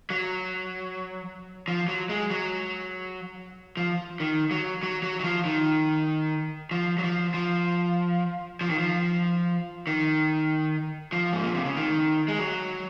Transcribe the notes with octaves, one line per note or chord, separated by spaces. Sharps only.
F#3
F3
F#3
G#3
F#3
F3
D#3
F#3
F#3
F#3
F#3
F3
D#3
F3
F#3
F3
F3
F3
D#3
F3
D#3
F3
G#2
A#2
C3
C#3
D#3
G#3
F#3